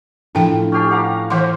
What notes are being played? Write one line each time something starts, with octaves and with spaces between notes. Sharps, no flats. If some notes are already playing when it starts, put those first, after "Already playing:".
A2 F3 D4 G5
C#4 G4 A5 G6 C7
F5 F#5 A#5
E3 C5 F#5 C6